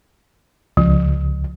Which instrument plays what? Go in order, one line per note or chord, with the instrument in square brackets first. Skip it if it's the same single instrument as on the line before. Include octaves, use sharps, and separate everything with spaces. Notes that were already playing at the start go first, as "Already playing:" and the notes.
[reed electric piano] C#2 [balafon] F3